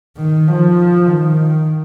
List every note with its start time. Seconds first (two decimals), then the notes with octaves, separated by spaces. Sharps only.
0.17 D#3
0.48 F3
1.06 D#3